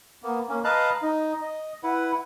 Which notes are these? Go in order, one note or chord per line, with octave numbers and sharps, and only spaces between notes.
A#3 B3
A#3 C#4
B4 D#5 F5 A5 A#5 F#6
D#4 D#5
D#5
E4 B4 F#5